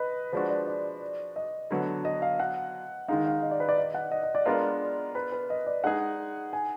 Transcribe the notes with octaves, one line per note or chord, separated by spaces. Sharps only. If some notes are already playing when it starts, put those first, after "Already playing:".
Already playing: B4 D#5
F3 G#3 D4 F#4 B4
D5
D5
D#5
D3 F#3 B3
D#5
F5
F#5
D#3 G#3 D#4 F5
F5
D#5
D5
B4
D5
D#5
F#5
D#5
D#5
D5
G#3 B3 D4 F4 A#4
B4
B4
D#5
D5
G#3 D#4 G#4 F#5
G#5